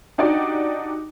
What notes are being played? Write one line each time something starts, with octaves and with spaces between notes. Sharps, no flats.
D4 D#4 F#4 G4 D5